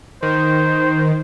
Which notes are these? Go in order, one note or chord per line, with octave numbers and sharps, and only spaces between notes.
D#3 C5